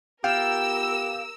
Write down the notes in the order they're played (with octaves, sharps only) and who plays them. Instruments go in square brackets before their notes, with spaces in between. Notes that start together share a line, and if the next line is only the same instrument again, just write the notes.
[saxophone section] B3 G4 [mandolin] F4 [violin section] A#4 E6 [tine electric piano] G5